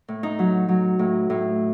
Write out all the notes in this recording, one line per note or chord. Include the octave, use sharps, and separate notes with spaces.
A2
D#4
F#3
F#3
A2
A2